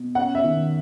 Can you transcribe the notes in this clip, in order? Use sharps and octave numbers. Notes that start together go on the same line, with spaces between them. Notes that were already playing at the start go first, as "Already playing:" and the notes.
Already playing: B2
C#4 F#5
E5
D#3